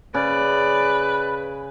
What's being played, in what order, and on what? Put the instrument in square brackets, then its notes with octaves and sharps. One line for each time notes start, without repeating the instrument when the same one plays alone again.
[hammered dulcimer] C#3 [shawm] B4 [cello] D5